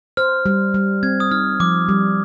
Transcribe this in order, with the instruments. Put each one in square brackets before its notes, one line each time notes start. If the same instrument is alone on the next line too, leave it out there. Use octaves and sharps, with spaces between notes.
[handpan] C5 [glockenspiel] F6
[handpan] G3
G3
[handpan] C4 [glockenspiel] G#6
[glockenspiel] D#6
[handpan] D#4 [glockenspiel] F6
[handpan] F3 [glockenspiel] D6
[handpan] G3